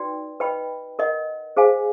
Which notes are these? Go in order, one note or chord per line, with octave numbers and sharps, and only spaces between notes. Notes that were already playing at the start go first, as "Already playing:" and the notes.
Already playing: D#4 F#4 B4 D5 G5
B4 D#5 G5 B5
A#4 D#5 F#5
G#4 C5 F5 G#5